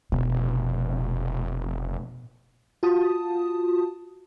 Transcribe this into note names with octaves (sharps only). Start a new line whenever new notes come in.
F1 B2
F4 F#4 A5 D#6